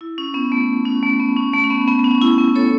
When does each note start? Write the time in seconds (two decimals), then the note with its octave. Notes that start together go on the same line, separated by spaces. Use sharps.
0.01 E4
0.18 C#4
0.34 B3
0.52 A3
0.85 C#4
1.03 A3
1.20 B3
1.37 C#4
1.53 A3
1.64 C#4
1.70 B3
1.88 B3
1.99 B3
2.04 C#4
2.21 E4
2.38 B3
2.56 A4 C#5